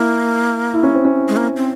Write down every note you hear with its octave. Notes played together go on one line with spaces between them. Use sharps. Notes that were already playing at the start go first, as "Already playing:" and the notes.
Already playing: A#3 E4
E4
C#4
C4
C#4
G#3
A#3
C4